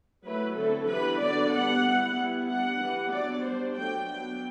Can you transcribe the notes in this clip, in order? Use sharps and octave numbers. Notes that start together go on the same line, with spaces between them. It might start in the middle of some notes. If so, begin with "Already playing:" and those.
F#3 A3 E4 B4
D3 F#3 C4 E4 A4
E3 G3 B3 D4 B4
D3 F#3 B3 D4 D5
G3 B3 D4 F#5
G3 B3 E4
G3 B3 E4
G3 D4 F#5
E3 G3 B3
F#3 B3 D4 D5
G3 D4 C5
F#3 A3 D4 G5
F#3 B3 D4 G5